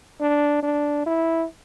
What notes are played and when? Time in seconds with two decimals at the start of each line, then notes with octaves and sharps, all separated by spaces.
0.21 D4
0.63 D4
1.06 E4